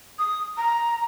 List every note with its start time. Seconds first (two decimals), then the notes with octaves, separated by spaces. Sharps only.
0.19 D#6
0.57 A#5